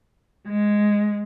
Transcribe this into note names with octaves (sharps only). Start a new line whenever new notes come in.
G#3